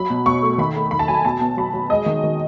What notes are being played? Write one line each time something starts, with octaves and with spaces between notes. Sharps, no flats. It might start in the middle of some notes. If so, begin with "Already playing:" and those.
Already playing: F#3 B5
B2
B2 C#6
A3
D#3 B5
A3
D#3 B5
A5
F#3 G#5
B2 A5
B3
F#3 B5
F#3
G#3 D#5
D#3
D#3